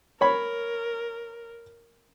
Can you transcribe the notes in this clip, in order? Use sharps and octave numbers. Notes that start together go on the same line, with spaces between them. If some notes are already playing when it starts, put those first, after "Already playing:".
A#4 C#5 B5